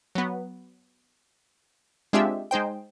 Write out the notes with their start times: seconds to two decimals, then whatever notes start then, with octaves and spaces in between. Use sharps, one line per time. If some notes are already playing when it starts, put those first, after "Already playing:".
0.15 F#3 B3
2.13 G#3 C4 D4 F4 G4 E5
2.51 G#3 D#4 C5 G5